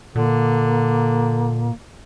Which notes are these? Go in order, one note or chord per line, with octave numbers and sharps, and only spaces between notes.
A#2 D3 A#3